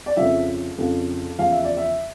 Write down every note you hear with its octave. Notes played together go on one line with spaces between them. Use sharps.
D5
F2 C#3 F3 E5
F2 C#3 F3
E2 C#3 F3 F5
E5
D5
E5